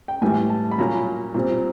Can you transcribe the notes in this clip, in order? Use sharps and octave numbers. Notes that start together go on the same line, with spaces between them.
G5
A2 E3 G3 G#5
A5
B5
A#2 F#3 A#3 C#4 A#5
A#2 G3 C4